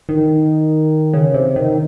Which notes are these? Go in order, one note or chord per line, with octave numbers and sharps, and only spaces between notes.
D#3
C#3
C3
D#3